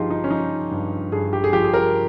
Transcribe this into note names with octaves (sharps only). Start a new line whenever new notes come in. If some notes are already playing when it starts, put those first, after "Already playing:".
Already playing: G2 F3 D#4 F4 G4 G#4
D#4
C#4
F3 D#4
G2
G2 G#4
G4
G#4
F3 G4
G#4
A#4